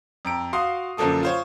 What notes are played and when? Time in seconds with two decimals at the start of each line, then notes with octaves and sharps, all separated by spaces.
0.25 F2 A#5 D7
0.53 F#4 F5 C6 D#6 C7
0.97 F#2 D3 F3 A#3 A4 D#6
1.23 F4 C5 C#5